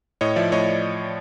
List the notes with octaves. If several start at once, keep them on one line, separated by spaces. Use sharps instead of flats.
A2 C#5 D#5
F3 D5 E5
A2 C#5 D#5